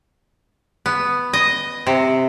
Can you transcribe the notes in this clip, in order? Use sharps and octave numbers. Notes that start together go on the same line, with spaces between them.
B3
D#5
C3